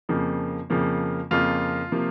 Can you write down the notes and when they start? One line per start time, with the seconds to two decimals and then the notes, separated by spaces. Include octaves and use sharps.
0.09 F2 C#3 F3 A#3
0.70 F2 C#3 F3 A#3
1.31 F2 C#3 F3 A#3 F4
1.92 C3 F3 A#3